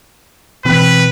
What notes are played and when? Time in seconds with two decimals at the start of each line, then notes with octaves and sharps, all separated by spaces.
0.65 B2 E3 C4 B4